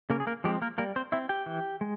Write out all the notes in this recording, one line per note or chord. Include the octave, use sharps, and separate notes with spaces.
C#3 A#3 A#4
G#4
A#3 A#4
F3 G#3 C4 G4
A#3 A#4
G3 A#3 A#4
C4 C5
C4 E4 E5
G4 G5
E3
G#3